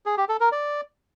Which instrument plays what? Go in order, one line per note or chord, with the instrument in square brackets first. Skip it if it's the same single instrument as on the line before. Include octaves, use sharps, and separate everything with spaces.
[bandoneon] G#4
G4
A4
A#4
D5